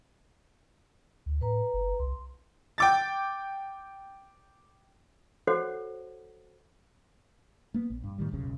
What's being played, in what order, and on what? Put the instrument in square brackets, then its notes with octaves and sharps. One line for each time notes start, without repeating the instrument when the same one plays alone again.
[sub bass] D2
[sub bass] A2 [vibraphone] B4 A#5
[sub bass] F#1
[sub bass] C2 [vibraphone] C6
[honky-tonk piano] G5 D6 A6
[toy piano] F#4 A4 C5 C#5 F#5
[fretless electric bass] A#3 B3
A#1
G2
A2 D#3 G3
E1 B1 F#2 C#3